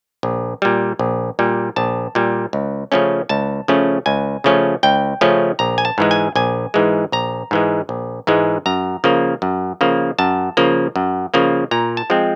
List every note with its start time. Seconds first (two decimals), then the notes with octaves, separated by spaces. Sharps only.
0.23 A#1
0.62 A#2 G3
0.99 A#1
1.39 A#2 G3
1.76 A#1 A5
2.15 A#2 G3
2.53 C#2
2.92 C#3 F3 A3 C#4
3.29 C#2 A5
3.68 C#3 F3 A3 C#4
4.06 C#2 G#5
4.44 C#3 F3 A3 C#4
4.83 C#2 G5
5.21 C#3 F3 A3 C#4
5.59 A#1 A#5
5.78 G#5
5.85 A5
5.98 G#2 E3 G#3
6.11 G#5
6.36 A#1 G#5
6.74 G#2 E3 G#3
7.12 A#1 A#5
7.51 G#2 E3 G#3
7.89 A#1
8.27 G#2 E3 G#3
8.66 F#2 A#5
9.04 C#3 F3 A#3
9.42 F#2
9.81 C#3 F3 A#3
10.19 F#2 A5
10.57 C#3 F3 A#3
10.96 F#2
11.34 C#3 F3 A#3
11.71 A#2 A#5
11.97 A5
12.10 F3 G#3 C4